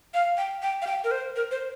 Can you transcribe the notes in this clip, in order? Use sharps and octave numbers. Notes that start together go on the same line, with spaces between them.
F5
G5
G5
F5
G5
A#4
C5
A#4
C5